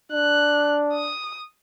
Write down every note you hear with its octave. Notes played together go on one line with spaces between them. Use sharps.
D4 F#6
D#6